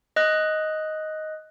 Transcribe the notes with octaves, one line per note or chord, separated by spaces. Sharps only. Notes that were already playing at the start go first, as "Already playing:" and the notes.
D#5 F#6